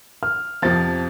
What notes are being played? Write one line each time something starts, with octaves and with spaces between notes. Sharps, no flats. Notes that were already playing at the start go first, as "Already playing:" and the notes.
F6
F2 C3 F3 A6